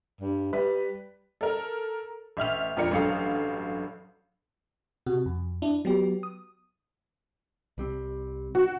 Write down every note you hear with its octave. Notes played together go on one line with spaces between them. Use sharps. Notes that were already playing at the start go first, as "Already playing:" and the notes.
G2
G3 B4
A4 A#4
A1 E5 F6 F7
F2 F3 F4 A#4 D5 C#7
A1 G2 F#3 A4 F5 D#6
C3 F#4
F2
D4 E4
F#3 B3 G4
D#6
C2 G3 C4
F#4